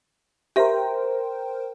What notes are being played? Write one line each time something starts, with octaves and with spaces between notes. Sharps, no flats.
G4 A#4 C5 E5 G5